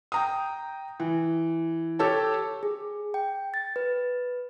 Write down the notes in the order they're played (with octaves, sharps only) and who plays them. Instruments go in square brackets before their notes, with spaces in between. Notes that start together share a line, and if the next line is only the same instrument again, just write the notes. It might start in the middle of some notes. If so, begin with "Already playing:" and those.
[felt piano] G5 A#5 D#6
E3
G4 A4 C#5 A5
[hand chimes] G#4
G5
A6
B4